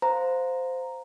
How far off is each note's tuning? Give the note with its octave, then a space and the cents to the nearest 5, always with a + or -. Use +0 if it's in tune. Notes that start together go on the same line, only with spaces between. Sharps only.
C5 -10 F5 +20 A#5 +0